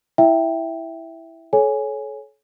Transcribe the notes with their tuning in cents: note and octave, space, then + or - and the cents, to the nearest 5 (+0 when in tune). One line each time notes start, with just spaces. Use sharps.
E4 +0 E5 +0 G5 +0
A4 -40 C#5 +0 G#5 +0